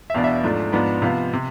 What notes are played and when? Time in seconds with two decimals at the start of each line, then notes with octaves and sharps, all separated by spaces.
0.10 E5
0.14 E2 B2 B3 D4 F5
0.24 E5
0.44 G#2 F3 A3 D4
0.72 G#2 F3 B3 D4
1.02 C3 F3 B3 F5
1.33 C3